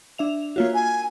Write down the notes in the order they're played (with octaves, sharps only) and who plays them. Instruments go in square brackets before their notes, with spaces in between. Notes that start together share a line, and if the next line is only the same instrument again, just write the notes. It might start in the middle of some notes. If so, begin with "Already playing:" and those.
[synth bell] D4 E5 F7
[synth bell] A#3 F4 F#4 [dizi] C#5
[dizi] G#5